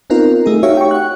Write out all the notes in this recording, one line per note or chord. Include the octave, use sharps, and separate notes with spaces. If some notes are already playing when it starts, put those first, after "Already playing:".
B3 C4 D#4 F4 A#4
A3 D#4 G#4
D#4 F#4 G4 C#5 E5 F5
G5 C#6
F#5 F#6